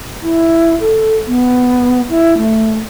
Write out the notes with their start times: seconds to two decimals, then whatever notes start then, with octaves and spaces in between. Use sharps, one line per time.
0.23 E4
0.80 A4
1.27 B3
2.10 E4
2.37 A3